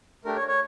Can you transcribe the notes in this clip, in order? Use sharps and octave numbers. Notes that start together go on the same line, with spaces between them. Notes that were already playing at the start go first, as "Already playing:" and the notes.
A3 D4 G4 A#4
C#5
C#5